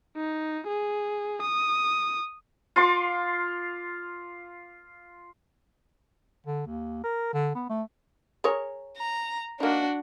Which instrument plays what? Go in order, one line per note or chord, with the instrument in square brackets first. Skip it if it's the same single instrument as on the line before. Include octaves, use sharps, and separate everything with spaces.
[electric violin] D#4
G#4
D#6
[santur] F4 C6 D6
[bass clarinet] D3
D#2
A#4
D3
B3
A3
[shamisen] G#4 A#4 C#5
[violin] A#5
[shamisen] A#3 D#4 [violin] D4 F#4